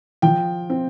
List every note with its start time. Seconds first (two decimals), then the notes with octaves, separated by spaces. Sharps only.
0.22 F3 G5
0.70 C4